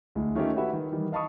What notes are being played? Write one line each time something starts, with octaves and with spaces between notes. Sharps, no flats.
D2 G#3 E4
D#3 A3 C#4 D#4 F4 G4
E4 F#4 G4 A4 B4 E5
D#3
D#3 E3 G3
D#5 F5 A5 B5 C#6 D#6